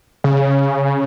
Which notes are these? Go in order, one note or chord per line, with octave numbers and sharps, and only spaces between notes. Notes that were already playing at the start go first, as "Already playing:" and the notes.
C#3